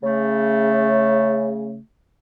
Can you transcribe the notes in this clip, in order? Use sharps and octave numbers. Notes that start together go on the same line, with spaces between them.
C#3 A3